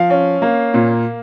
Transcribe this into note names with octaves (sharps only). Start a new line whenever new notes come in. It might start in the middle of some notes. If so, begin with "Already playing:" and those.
Already playing: F3 F5
C#4
A#3
A#2